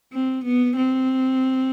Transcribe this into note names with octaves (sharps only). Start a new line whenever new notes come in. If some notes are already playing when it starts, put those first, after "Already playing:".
C4
B3
C4